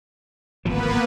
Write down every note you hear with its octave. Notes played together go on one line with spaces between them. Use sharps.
D1 G#1 F3 A#3 B3 B4